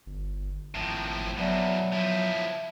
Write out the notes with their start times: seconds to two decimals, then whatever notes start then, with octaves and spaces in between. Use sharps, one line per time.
0.06 G1
0.75 G#1 A2 F3
1.37 E2 B2 F#3 B3 D5 E5
1.92 F3 E4 E5